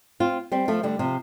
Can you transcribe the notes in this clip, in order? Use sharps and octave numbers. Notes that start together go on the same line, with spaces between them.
C4 F4
G3 C4
F3 A3
D3 G3
C3 F3